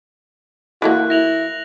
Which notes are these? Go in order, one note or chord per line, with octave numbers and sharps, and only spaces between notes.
E3 A3 A#3 F#4 F#6
E4 A#6 F7 F#7